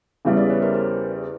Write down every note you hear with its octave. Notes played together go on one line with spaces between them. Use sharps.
E2 C#3 E3 G3
D5 E5
B4 C#5
A#4 C5
A#4 C5